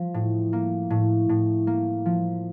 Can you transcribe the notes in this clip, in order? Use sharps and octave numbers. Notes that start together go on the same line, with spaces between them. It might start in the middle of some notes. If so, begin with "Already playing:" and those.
Already playing: F3
A2
A#3
A2
A2
A#3
F3